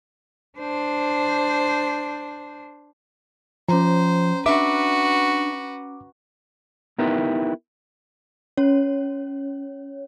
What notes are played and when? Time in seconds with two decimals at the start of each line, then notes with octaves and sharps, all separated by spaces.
0.58 D4 C5
3.69 F3 C#4 C5 A#5
4.46 D4 F#4 B4 E5 D6
6.98 B3 D#4 E4 G4 A#4 B4
8.57 C#4 C#5